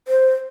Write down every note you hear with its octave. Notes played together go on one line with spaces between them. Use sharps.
C5